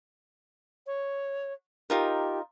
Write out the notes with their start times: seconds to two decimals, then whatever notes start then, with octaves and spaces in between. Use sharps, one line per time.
0.86 C#5
1.90 D#4 F4 G4 A#4